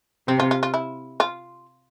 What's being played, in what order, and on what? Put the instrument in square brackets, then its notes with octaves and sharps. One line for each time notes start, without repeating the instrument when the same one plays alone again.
[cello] C3 [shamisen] C4
[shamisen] F4
F4
F4
E4
F4